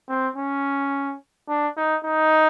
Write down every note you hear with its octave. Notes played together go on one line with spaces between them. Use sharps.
C4
C#4
D4
D#4
D#4